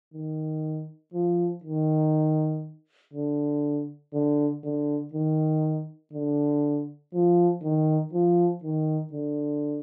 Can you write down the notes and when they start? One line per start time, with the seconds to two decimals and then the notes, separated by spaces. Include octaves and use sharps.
0.14 D#3
1.14 F3
1.64 D#3
3.13 D3
4.13 D3
4.64 D3
5.14 D#3
6.13 D3
7.14 F3
7.63 D#3
8.13 F3
8.63 D#3
9.13 D3